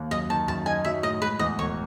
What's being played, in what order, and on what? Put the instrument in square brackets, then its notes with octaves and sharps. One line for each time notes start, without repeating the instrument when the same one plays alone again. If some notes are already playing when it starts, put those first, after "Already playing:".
Already playing: [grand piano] D#2
[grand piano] F#2 [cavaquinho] D#5
[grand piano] D#3 [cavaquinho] A5
[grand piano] F#2 [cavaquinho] A5
[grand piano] D#4 [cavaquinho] G#5
[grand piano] F#3 [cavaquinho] E5
[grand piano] A2 [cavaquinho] D#5
[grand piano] G#3 [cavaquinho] B4
[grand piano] E2 [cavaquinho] D#5
[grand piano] E1 [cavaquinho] C#5